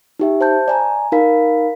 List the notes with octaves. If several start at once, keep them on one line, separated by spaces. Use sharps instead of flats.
D#4 G4 E5
C5 A5 G6
D5 G#5 A#5
D#4 A#4 F5 B5 B6